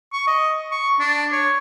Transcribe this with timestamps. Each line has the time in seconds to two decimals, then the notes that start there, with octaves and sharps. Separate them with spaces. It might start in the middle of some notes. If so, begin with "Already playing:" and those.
0.13 C#6
0.27 D#5
0.72 C#6
1.00 D4
1.33 C#5